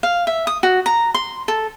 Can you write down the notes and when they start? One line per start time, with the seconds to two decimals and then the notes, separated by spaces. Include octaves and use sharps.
0.03 F5
0.27 E5
0.47 D#6
0.63 F#4
0.86 A#5
1.14 C6
1.48 A4